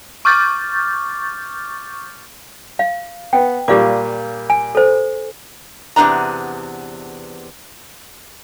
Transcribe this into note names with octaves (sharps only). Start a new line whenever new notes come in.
C#6 D6 F6 G6 A6
F5
B3 G5
A#2 G3 G4 F5 D6
G#5
A4 C5
E2 C3 F3 B3 D4 A#5